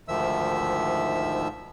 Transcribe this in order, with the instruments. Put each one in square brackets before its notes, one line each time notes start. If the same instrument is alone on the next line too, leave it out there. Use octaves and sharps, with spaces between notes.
[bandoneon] D2 G#2 D#3 F3 E5 E6